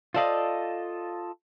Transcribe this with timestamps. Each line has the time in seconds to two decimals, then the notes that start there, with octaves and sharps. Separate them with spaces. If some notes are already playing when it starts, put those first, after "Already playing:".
0.14 F4 A4 C5 D5 D#5 F5